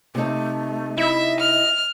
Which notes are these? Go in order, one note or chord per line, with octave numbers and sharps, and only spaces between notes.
C3 A3 D#4
E4 D#5 E5
F6